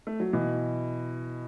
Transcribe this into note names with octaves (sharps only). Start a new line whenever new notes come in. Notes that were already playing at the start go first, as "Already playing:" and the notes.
A3
F#3
B2 E3